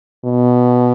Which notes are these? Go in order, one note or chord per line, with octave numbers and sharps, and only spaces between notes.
B2